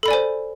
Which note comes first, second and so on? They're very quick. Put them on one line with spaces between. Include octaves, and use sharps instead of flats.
A4 B5 D5 G#5 C5